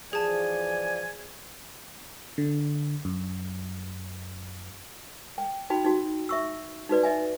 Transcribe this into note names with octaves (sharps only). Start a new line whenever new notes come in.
E3 F3 G#4 D5 G#5 A5
D3
F#2
G5
D#4 F#4 G5 B5
D#4 F#4
E5 C#6 E6
D#4 F#4 B4 D5
D#5 E5 G#5